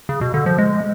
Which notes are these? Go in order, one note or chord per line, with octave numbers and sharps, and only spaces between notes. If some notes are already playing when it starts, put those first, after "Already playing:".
C#3
B2
D3
F3
G#3